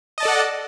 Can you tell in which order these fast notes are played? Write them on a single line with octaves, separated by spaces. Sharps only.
D#5 A5 D5 A4 F#5